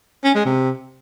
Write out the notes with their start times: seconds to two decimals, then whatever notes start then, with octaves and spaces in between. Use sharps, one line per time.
0.24 C#4
0.35 G#3
0.45 C3